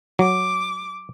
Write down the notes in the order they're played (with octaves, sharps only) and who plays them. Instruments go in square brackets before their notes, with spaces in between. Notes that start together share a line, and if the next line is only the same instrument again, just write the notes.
[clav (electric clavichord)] F#3 [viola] D6